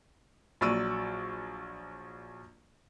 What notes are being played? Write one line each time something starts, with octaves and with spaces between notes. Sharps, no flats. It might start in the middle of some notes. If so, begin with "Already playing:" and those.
A#1 F#3 D5 C#6 E6 D#7